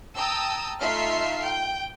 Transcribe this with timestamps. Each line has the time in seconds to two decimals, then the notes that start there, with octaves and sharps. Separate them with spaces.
0.16 G5 A5 A#5 D#6 E6
0.81 A3 D#4 F4 E5 F6 C7
1.45 G5